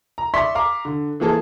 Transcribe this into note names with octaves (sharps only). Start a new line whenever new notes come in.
A#5
D5 E5 C6 C#6 B6
F5 A#5 D6
D3
E3 F3 A#3 G#4 A4